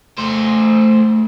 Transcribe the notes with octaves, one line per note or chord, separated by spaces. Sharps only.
A3 C5